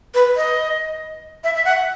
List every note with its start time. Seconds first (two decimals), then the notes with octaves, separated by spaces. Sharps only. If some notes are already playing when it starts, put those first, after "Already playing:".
0.14 B4
0.36 D#5
1.44 E5
1.56 E5
1.65 F#5